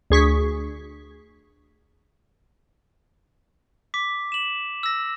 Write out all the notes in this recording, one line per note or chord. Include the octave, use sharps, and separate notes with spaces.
D2 G#4 C#6 B6
D6 B6
E7 F#7
E6 A#6